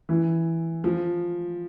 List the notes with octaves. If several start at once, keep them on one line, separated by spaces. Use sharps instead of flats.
E3
F3